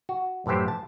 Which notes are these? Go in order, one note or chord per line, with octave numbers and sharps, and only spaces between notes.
F#4
F#2 A2 E3 G4 C5
A5